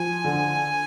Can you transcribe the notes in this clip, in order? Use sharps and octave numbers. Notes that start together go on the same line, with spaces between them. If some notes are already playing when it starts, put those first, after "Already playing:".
Already playing: F3 G#5
D3